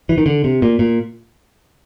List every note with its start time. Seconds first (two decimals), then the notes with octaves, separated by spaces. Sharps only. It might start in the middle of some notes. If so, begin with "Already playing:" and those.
0.09 E3
0.18 D#3
0.26 D3
0.44 C3
0.62 A#2
0.79 A#2